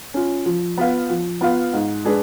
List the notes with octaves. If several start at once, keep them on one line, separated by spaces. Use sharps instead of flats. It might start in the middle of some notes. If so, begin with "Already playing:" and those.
C#4 F4
F3
B3 F4 B4 F5
F3
B3 F4 B4 F5
G#2
G#3 D4 G#4 B4